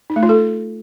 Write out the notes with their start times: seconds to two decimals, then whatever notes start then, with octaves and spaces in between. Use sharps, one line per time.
0.10 D#4
0.16 A3
0.23 F4
0.29 A4